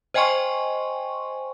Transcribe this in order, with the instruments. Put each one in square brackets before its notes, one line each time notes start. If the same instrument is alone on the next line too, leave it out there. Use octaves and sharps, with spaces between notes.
[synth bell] C5 D#5 G5 G#5 C6 C#6